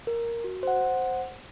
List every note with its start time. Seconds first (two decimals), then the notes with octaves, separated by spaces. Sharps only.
0.07 A#4
0.44 F#4
0.63 C5 F#5